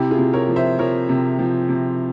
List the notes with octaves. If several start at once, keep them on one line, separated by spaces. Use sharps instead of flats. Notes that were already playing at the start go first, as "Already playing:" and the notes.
Already playing: C3 E4 G4
F4 G#4
C3
A#4 C#5
F3
C5 E5
F3 A#4 C#5
C3
F3
C3